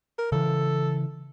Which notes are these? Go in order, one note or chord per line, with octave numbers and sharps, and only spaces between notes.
A#4
C#3 E3 A4